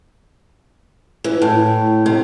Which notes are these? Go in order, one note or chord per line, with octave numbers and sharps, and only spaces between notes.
E3
A2
C3